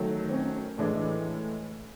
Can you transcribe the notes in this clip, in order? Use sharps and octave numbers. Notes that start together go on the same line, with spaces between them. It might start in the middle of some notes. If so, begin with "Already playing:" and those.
Already playing: D#3 F#3 A3
C4
C#4
A2 E3 G#3 D4